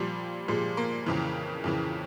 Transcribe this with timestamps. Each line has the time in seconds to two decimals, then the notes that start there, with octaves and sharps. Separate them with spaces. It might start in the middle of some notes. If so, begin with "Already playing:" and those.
Already playing: A#2 F3 G3
0.48 A#2 F3 G#3
0.77 A#3
1.06 F2 C#3 E3
1.64 F2 C#3 E3